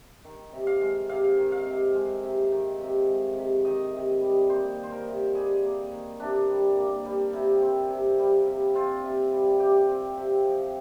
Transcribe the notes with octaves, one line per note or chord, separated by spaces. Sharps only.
D#3
C3
F5
G#3
C3 F5
D#3
F5
C3
G#3
C3
D#3
C3
G#3
C3
D#3 D#5
C3
G3
A#3 C5
D#3
C5
A#4
C3
G3 G#4
A#3
D#3
C3 D4
G3
A#3
G3
C3
C4
C3
G3
C3
C4 F4
C3
G3
C3 G4
C4
C3
F3